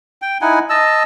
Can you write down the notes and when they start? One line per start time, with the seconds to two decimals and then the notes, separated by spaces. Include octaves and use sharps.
0.22 G5
0.41 D#4 E4 F#5 G#5
0.70 D#5 A5 E6